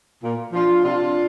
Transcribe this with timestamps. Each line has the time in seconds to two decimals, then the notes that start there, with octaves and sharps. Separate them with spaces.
0.23 A#2
0.53 F3 D4 F4
0.83 C3 D4 F4